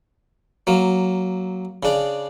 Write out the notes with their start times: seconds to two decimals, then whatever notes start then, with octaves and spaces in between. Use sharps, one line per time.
0.67 F#3 A#3
1.83 C#3 D4